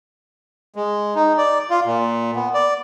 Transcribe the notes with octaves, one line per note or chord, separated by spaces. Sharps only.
G#3
D#4
D5
F4
A#2
B3
D5